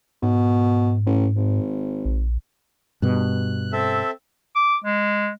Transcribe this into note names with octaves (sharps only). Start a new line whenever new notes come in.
G#2 B2
A1
G#1
A#1
G2 B2 F#6
C4 A4 E5
D6
G#3